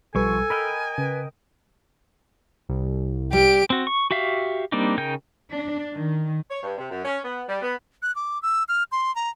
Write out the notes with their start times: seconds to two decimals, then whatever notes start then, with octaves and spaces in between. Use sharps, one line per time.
0.15 B1 F3 G3 A4 B4 G#5 C#6
0.50 A#4 D#5 G5 B5 F6
0.98 C#3 B4
2.69 C2
3.33 G3 G4 D7
3.70 C4 F#4
3.87 C#6
4.11 F#4 G4 E5 F5
4.72 G3 A#3 C4 D4 D#4
4.98 C#3 D#4 A#4 G5 G6
5.52 D4
5.95 D#3
6.50 C#5
6.63 G2
6.77 C3
6.91 F#2
7.04 C#4
7.24 B3
7.49 G3
7.61 B3
8.02 F#6
8.16 D6
8.43 E6
8.69 F6
8.92 C6
9.16 A#5